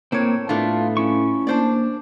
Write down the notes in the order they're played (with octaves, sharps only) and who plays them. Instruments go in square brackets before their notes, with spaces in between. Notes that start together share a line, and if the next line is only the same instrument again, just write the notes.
[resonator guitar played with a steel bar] A2 C#5 [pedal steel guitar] A#3 C4
[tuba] A2 [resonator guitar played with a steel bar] A3 B3 D4 [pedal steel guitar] F4
[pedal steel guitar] C#4 E4 C#6
[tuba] A#3 [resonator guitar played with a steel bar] D4 C5 D5